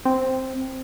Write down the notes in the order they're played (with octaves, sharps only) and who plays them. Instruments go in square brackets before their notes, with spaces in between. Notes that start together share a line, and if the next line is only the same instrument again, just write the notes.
[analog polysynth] C4